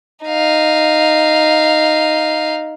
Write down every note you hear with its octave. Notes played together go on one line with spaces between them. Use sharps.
D#4 F5